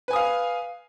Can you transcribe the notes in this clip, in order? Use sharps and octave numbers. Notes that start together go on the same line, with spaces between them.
B4 F5 G#5 D#6